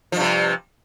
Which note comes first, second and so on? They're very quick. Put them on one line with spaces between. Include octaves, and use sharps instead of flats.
F3 G2 C3